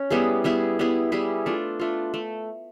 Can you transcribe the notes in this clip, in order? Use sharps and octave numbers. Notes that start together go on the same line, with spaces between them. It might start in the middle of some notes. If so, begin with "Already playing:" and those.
Already playing: C#4
G3 B3 E4 G#4
G3 B3 E4 G#4
G3 B3 E4 G#4
G3 B3 E4 G#4
A3 D4 F4
A3 D4 F4
A3